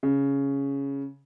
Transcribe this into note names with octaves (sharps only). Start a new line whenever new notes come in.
C#3